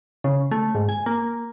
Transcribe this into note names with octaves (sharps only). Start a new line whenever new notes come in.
C#3
A3
G#2
G#5
A#3